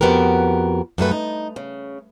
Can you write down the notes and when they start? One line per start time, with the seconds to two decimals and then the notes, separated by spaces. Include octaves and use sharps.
0.01 F2 B3 F#4 G4 A#4
0.98 F#2 G3 A3 B4
1.11 D#4
1.56 C#3